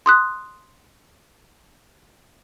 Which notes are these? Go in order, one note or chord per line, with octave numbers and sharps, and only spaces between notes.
C6 D#6 F#6